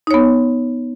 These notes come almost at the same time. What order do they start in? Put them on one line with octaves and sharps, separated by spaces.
D#4 C#5 B3